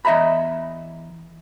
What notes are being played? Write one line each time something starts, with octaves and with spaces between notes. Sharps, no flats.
E2 D#5 E5 A#5 B5